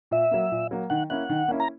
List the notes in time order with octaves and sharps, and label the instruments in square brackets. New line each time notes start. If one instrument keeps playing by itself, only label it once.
[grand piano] A#2 [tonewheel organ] E5
[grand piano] F#3 A#3
A#2
F#3 A#3
[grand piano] D#3 [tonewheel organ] F#5
[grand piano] A#3 C#4 E4 [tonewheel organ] F#5
[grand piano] D#3
A#3 C#4 E4
[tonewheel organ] A#5